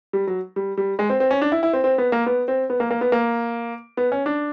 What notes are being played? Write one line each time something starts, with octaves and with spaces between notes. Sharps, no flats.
G3
F#3
G3
G3
G#3
C4
C4
C#4
D4
E4
E4
C4
C4
B3
A#3
B3
C4
B3
A#3
A#3
B3
A#3
B3
C#4
D4